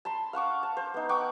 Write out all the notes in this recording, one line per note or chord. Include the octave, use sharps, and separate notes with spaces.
A5 B5 C6
F5 F#5 C#6 D6
A5
C5
B3 D#4
F#5 G5 C#6 D6